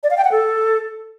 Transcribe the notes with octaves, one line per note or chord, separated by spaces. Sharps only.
D5
F5
G5
F#5
A4